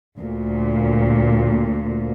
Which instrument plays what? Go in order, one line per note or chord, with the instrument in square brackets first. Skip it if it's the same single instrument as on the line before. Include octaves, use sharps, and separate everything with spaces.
[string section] D2 A#2